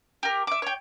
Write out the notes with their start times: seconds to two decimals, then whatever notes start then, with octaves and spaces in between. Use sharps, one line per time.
0.23 G4 A#4
0.47 E5 D6
0.62 C#5 G5